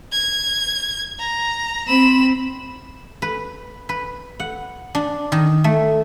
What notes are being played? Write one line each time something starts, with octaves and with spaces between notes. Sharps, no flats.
G#6
A#5
C4 B5 E7
B4
B4
F#5
D4
D#3
A3